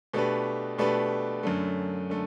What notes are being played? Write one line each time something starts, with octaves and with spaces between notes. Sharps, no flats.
B2 A3 D4 G4 B4
B2 A3 D4 G4 B4
F#2 D3 A3
D3 A3